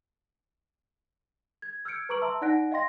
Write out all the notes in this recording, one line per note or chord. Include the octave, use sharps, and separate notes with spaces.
G#6
E6 F6 G6 G#6 C#7 D7
B4 A#5 C#6 D6 D7 F#7
E5 A5 A#5 C6 E6
D#4 D5 F#5 F#6 A#6 D7
D#5 F5 G5 C6 A#6